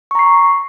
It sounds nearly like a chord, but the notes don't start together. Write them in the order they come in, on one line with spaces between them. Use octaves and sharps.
C#6 A#5 C7